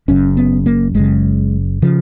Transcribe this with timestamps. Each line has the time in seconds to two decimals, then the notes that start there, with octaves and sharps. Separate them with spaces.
0.08 F#1 F#2 C#3 C#4
0.37 B3
0.66 A#3
0.94 F#1 F#2 C#3 G#3
1.82 C#3 F3